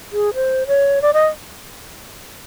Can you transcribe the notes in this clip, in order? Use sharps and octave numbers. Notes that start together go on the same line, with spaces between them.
G#4
C5
C#5
D5
D#5